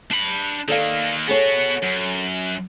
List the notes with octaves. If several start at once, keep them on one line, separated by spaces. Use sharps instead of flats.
D4 B5
D#3 A#3 A4 D5 F5
B3 F#4 G#4 A4 C#5
F#2